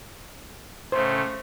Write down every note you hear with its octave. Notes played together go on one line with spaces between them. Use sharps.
A2 C#3 A3 C5